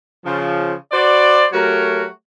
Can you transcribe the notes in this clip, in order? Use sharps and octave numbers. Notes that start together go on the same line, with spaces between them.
C#3 F3
F#4 B4 C5 D5
F#3 A3 F#4 G4 A#4 C#5